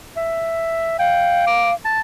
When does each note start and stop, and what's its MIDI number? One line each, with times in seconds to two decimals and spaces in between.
0.17 0.97 76
0.99 1.74 77
0.99 1.44 79
1.47 1.71 86
1.85 2.01 81